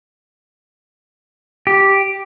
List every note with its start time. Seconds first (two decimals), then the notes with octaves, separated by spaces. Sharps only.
1.67 G4